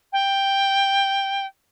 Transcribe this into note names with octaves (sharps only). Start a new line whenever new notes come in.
G5